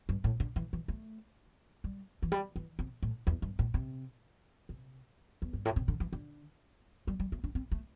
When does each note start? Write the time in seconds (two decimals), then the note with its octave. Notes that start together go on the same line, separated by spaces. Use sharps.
0.09 G2
0.24 A2
0.40 D3
0.56 E3
0.73 E3
0.88 A3
1.84 G3
2.22 E3
2.32 G3
2.56 E3
2.79 C3
3.03 A2
3.27 E2
3.42 G2
3.59 A2
3.74 C3
4.69 C3
5.42 E2
5.53 G2
5.65 A2
5.76 C3
5.88 D3
6.00 E3
6.13 D3
7.07 G3
7.20 G3
7.32 A3
7.44 D4
7.55 C4
7.72 A3